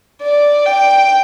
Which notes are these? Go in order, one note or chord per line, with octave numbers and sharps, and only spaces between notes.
D5
G5